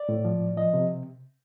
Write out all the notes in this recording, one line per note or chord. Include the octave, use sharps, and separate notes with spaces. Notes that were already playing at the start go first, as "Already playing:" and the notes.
Already playing: D5
A2
F3
A2
F3 D#5
C3